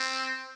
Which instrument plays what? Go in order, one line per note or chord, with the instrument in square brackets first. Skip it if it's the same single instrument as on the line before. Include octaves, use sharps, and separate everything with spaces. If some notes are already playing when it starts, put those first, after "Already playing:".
Already playing: [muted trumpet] C4